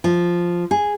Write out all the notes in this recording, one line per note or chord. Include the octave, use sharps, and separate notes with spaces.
F3
G#4